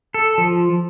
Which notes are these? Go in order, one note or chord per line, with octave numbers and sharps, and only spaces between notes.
A4
F3